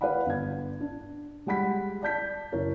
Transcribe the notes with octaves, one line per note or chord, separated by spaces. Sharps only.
B4 D5 F5 F#5 B5
G1 G#6
D4
G3 G#3 F#5 B5 B6
D5 A5 G6 B6
F#1 E4 A#4 C#5